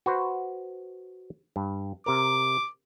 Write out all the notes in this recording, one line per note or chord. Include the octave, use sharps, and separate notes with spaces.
F#4 B4 C5
G2
C3 A#4 D6